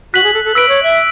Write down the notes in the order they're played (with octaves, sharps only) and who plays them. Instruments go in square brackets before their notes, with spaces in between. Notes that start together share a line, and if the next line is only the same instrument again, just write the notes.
[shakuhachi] F#4 [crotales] F#6 B6 F#7
[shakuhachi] G#4
A4
A4
[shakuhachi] B4 [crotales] E6 B6 D7
[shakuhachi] C#5
E5